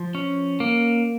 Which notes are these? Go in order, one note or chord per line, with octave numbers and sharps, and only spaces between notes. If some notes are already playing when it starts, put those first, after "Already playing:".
Already playing: F3
C#4
A#3